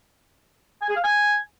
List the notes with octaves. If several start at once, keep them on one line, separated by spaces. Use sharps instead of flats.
G#5
G#4
F5
G#5